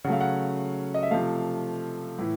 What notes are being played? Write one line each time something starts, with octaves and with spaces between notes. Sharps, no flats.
C#3 F#3 A3 F5 F#5
F#5
D#5
E5
C3 F3 A3 F5
A2 E3